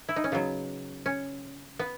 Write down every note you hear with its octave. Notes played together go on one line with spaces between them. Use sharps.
E4
D#4
C#4
C#3 F#3 B3
C#4
B3